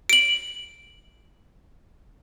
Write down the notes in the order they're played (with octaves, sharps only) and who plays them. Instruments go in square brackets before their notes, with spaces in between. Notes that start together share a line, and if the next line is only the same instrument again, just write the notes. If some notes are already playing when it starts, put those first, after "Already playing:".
[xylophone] D7 F#7